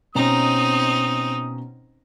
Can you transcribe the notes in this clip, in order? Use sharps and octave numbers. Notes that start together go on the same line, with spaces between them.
B2 C4 C#4 D#4 A#5 D#6